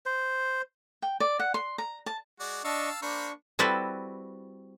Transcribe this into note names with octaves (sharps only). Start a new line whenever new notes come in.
C5
G5
D5
F#5
C6
A#5
A5
G#3 F#4 D5
D4 D#5 F5 A5 C#6 E6
A#3 D4 C5 B5 C#6
G3 C4 E4 F#4 A4 B4